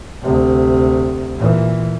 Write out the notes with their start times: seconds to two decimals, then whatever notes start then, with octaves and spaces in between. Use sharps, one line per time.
0.22 D2 C3
1.36 A#2 E3